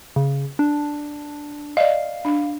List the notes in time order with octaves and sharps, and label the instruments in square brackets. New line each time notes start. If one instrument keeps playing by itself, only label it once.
[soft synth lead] C#3
D4
[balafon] D5 D#5 [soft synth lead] F5
[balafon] D4